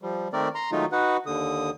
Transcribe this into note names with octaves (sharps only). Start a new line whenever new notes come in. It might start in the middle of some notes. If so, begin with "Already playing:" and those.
F3 G3
D#3 A3 C4 A#4 D5
A#5 C6
D#3 F#3 G#3 A3 D#4 F4
D#4 F#4 B4 F#5
D#2 D3 D#6